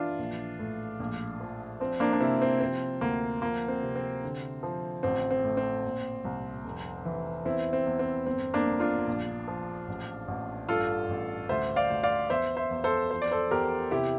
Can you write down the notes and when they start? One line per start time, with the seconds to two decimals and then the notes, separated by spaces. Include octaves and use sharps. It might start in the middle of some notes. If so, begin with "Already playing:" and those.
Already playing: E3 D4 F4
0.19 A#1
0.59 A2
1.00 A#1
1.40 F3
1.80 F3 C4
2.00 A#3 D4
2.13 D4
2.20 C3 C4 E4
2.42 C4
2.61 F3 C4
3.01 D2 A#3
3.42 F3 A#3
3.68 C4
3.83 C3
3.96 C4
4.23 D3
4.63 F3
5.03 A1 C4
5.31 C4
5.44 A2
5.57 C4
5.85 A#2
6.25 C2
6.64 F1
7.05 E3
7.45 E2 C4 E4
7.73 C4
7.86 E2
7.99 C4
8.26 G1 C4
8.54 A#3 D4
8.67 G1
8.80 D4 F4
9.07 A#1
9.48 F3
9.88 A1
10.28 A1
10.69 G2 F4 A4
11.09 A1
11.49 D2 C5 E5
11.76 D5 F5
11.90 D2
12.03 D5 F5
12.30 E2 C5 E5
12.56 C5 E5
12.71 E2
12.84 A4 C5
13.11 F3 C5
13.22 D5
13.32 A4 C5
13.51 E2 G4 A#4
13.91 C3 E4 G4